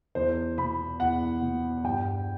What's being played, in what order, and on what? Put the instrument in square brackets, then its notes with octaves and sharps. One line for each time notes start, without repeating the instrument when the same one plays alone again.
[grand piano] E2 C5
B2 B5
E2 F#5
B2
G2 G5